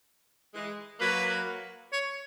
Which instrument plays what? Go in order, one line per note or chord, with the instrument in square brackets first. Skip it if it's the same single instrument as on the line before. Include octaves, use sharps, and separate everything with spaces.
[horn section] E3 G#3
[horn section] F#3 A#3 [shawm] B4
[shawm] C#5